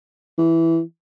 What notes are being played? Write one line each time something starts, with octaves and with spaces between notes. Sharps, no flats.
E3